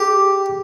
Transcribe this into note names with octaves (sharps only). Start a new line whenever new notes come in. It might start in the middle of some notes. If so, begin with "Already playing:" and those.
Already playing: G4 G#4